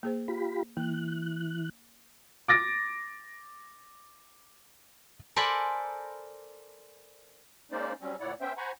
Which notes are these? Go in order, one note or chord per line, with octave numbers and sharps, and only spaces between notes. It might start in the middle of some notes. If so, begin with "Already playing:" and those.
A#3 G#4 C5
F4 G4 B5
E3 A#3 F#6
D6 A6 A#6 D7
A4 A#4 C5 D5 G#5 B5
G#3 A#3 C#4 D#4 C5 D5
F#3 G3 C4 C#4
D2 A#2 E4 C#5 D5 F#5
B3 C#4 C5 E5 G5
C5 F#5 G#5 A#5 B5 C#6